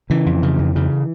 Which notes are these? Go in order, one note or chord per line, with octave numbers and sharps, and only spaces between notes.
C#3 E3
F2
C#3
F2
C#3